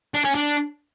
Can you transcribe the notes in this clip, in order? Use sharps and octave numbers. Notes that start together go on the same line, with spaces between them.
D4
C#4
D4